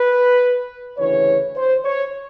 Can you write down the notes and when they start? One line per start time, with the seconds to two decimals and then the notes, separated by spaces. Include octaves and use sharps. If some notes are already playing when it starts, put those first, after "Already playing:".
Already playing: B4
0.98 D2 C#3 E3 C#5
1.56 C5
1.85 C#5